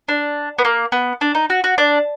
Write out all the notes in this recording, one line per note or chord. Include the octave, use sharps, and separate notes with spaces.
D4
B3
A#3
B3
D4
D#4
F#4
F#4
D4